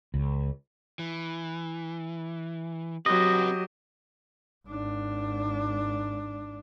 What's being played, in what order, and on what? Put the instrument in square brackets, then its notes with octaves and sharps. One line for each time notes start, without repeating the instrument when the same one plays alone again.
[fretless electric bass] C#2
[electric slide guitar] E3
[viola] F#3 G4 [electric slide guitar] C4 F#4 B4 [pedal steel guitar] D#5
[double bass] G#1 D4